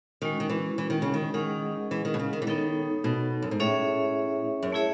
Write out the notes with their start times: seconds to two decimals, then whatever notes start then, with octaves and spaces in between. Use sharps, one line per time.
0.22 D#3 G#3 C#4 F#4
0.40 D#3
0.50 E3
0.78 E3
0.90 D#3
1.02 C#3
1.14 D#3
1.34 D#3 G#3 C#4 G#4 D#5 F#5
1.91 E3
2.05 D#3
2.14 B2
2.19 C#3
2.33 D#3
2.42 E3
2.47 D#3 B3 D#4 A4 C#5
3.04 B2
3.42 F#2
3.51 G#2
3.60 A2 C#4 G#4 C#5 E5
4.63 F#2
4.72 A3 E4 G#4 C#5 E5